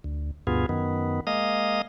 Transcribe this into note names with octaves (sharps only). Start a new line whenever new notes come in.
D2
D2 G2 B2 B3 F4 G#4
F#2 D#3 B3
G#3 A#3 D#5 F5 D#6